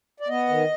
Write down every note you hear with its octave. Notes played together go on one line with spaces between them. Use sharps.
D5
B3 D#5
D#3